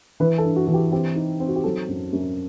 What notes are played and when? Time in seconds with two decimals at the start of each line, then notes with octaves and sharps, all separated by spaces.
0.20 E3 B4
0.38 A4
0.44 G2
0.56 F#4
0.67 E3 F#4
0.74 G4
0.92 C4 G4
1.16 D#4
1.40 C4
1.48 F#4
1.56 G4
1.64 F#3 A4
1.88 F#2
2.13 F#2